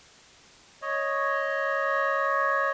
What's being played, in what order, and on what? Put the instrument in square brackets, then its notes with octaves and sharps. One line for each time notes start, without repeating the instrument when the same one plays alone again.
[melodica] C#5 D#5